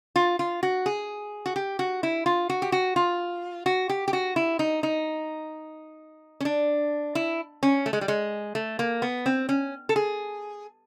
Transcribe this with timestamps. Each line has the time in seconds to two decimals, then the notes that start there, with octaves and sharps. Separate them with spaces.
0.16 F4
0.39 F4
0.63 F#4
0.86 G#4
1.46 F#4
1.56 G4
1.79 F#4
2.03 E4
2.26 F4
2.50 F#4
2.62 G4
2.72 F#4
2.96 F4
3.66 F#4
3.89 G4
4.08 G4
4.13 F#4
4.36 E4
4.59 D#4
4.83 D#4
6.40 C#4
6.45 D4
7.15 E4
7.63 C#4
7.86 A3
7.93 G#3
8.01 G3
8.08 G#3
8.55 A3
8.79 A#3
9.02 B3
9.26 C4
9.49 C#4
9.89 A4
9.96 G#4